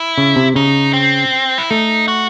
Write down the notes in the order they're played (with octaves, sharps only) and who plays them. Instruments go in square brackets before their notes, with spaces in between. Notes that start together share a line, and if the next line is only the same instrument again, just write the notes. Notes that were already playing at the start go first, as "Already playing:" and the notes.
Already playing: [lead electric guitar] E4
[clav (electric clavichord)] C#3
C3
[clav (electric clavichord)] C#3 [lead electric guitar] D#4
[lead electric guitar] C4
E4
[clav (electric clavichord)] A3 [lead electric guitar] D#4
[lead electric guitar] F#4